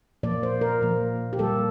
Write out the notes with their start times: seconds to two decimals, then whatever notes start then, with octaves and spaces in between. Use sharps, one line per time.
0.23 A#2 F3 A#3 D5
0.43 C5
0.61 A#4
0.81 A#2 F3 A#3
1.33 G4
1.38 A#2 G3 A#3 A4